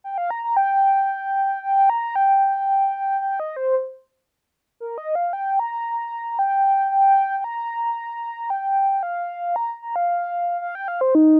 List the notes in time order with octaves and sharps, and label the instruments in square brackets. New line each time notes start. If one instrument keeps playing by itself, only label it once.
[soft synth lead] G5
F5
A#5
A#5
G5
G5
A#5
G5
G5
D#5
C5
A#4
D#5
F5
G5
A#5
G5
G5
G5
A#5
G5
F5
A#5
A#5
F5
F5
G5
F5
C5
D#4